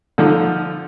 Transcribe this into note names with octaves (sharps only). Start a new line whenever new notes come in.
D3 F3 D#4